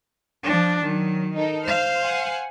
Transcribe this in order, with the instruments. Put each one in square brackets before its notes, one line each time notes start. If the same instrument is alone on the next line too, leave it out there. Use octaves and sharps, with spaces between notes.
[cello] F3 D4
[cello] D#3 [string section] F#3
[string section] D#4 A4 A#4
[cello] C5 F5 [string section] F6
[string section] F#5 G#5